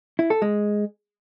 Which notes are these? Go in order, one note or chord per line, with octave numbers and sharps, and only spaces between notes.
E4
A4
G#3